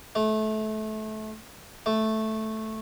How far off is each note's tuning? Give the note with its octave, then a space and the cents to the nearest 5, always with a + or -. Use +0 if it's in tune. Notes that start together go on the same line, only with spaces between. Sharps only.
A3 -25
A3 -5